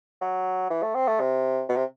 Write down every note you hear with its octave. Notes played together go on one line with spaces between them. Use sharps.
F#3
E3
A3
C4
A3
C3
B2
C3